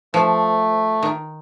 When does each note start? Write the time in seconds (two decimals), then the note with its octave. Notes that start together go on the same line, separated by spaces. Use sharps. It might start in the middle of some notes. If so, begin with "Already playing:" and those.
0.14 F3 A3
1.03 D#3